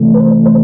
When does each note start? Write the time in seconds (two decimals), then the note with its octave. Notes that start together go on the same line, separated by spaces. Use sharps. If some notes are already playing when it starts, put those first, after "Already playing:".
Already playing: C3 E3 A3
0.14 B4
0.21 C5
0.46 C5